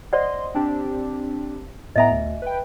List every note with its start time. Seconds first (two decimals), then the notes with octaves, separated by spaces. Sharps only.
0.13 C5 D5 D#5 F#5 C6
0.54 C4 D4 G4
1.96 A2 B3 D#5 E5 G#5 A#5
2.11 D2
2.42 B4 G5